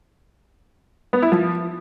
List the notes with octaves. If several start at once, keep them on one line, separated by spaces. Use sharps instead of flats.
B3
E4
F3